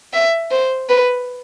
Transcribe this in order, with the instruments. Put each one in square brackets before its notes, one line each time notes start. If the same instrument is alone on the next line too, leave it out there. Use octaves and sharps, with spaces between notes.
[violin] E5
C5
B4